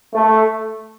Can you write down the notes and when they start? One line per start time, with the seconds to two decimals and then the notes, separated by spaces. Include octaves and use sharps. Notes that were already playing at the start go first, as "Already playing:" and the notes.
0.14 A3